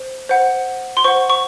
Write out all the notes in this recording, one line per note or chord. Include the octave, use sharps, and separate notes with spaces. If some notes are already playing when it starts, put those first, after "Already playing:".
Already playing: C5
C5 F#5
C6
C5 F#5 C#6
C#6